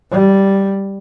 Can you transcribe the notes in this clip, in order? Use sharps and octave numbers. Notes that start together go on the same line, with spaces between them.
G3